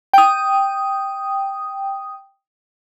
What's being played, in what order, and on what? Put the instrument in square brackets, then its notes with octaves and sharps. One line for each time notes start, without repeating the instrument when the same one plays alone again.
[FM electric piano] G5 D#6